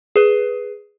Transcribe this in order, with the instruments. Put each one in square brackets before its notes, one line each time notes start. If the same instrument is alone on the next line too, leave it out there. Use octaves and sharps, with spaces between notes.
[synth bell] G#4 B4